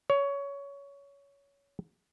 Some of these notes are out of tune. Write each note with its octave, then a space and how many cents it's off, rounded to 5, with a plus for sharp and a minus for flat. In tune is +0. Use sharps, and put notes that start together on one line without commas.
C#5 +20